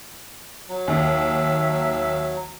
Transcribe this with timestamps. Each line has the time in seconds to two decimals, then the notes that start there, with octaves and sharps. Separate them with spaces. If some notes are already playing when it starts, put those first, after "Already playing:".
0.69 F#3
0.88 D#2 E5